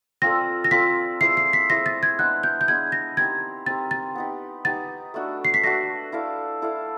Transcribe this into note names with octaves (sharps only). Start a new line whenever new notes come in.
C4 F4 A4 D5 A#6
A#6
C4 F4 A4 D5 B6
E4 G#4 C5 E5 C7
C7
B6
E4 G#4 C5 E5 A#6
A6
G#6
G#3 B3 D4 F#6
G6
G6
G#3 B3 D4 G#6
A#6
C4 D#4 G4 A#4 G#6
C4 D#4 G4 A#4 A6
A6
B3 D#4 G4
B3 D#4 G4 A6
A3 D4 F#4
C7
B6
A3 D4 F#4 A#6
E4 A4 D5 F5
E4 A4 D5 F5